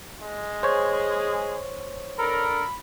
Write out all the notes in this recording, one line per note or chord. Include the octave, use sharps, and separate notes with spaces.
G#3
G#4 C5 C#5
D4 A4 A#4 B5